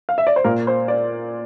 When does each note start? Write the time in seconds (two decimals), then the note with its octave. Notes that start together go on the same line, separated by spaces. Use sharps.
0.09 F5
0.18 E5
0.27 D5
0.36 C5
0.44 A#2 A#4
0.67 C5
0.88 D5